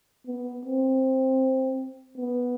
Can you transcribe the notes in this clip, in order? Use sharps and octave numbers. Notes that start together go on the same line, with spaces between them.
B3
C4
B3